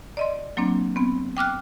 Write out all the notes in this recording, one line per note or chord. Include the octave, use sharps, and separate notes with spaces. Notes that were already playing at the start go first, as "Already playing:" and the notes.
D5 D#5 C6
F#3 A#3 C4 D4
B3 C4
G5 D6 F6 F#6